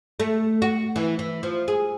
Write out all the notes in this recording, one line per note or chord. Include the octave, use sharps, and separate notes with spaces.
A3
F#4
E3
E3
F3
G#4